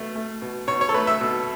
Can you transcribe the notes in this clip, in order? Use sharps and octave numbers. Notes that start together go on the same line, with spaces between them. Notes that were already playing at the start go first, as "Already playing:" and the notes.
Already playing: B2 A3
A3
B2
B2 C#5
C#5
A4
A3 B4
E5
B2